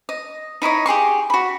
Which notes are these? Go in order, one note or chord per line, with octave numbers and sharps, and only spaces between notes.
D#5
D#4 E4 C#5 D#5
G4 G#4 C6 C#6
F#4 B5